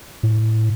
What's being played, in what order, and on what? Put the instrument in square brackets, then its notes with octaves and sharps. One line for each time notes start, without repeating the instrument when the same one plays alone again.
[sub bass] A2